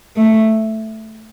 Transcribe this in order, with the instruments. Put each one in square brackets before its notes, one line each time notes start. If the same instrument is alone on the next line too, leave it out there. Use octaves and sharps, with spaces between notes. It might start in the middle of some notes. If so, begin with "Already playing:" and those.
[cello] A3